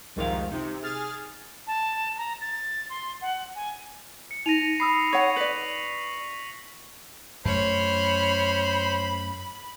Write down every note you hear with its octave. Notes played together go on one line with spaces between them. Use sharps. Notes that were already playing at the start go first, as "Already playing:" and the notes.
C2 F2 G#2 D#3 F3 F5
C3 D#4
G#4 F6 A6
A5
A#5
A6
C6
F#5
G#5
C#7
D#4 A#6 D#7 F7
B5 D#6 E6 C7
C#5 F#5 C#6 C7 F7
B4 D5 B6 F#7
F#2 A3 C5 C#5 B5 F6